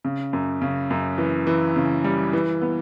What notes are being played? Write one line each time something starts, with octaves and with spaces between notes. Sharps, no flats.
C#3
F#2
C#3
F#2
E3
E3
C#3
G3
E3
B3